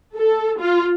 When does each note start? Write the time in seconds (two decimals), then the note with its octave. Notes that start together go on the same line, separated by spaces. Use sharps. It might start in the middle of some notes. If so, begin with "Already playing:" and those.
0.17 A4
0.61 F4